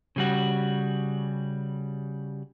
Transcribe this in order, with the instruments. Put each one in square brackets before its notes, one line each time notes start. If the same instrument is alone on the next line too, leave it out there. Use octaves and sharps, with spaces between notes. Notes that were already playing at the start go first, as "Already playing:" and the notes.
[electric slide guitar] C#3 G3 F#4